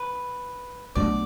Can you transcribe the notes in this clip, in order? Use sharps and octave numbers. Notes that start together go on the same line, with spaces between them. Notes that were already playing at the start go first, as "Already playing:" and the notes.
Already playing: B4
B1 B2 A3 D4 D5